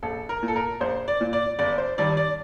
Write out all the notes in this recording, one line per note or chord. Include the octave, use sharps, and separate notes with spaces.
A#1 A4
A#4
A#2
A4
A#4
A#1 C5
D5
A#2
D5
G1 D5
C5
G2 D#3 D5
D5